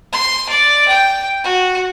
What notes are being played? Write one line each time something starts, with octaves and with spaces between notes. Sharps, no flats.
C6
D5
G5
F#4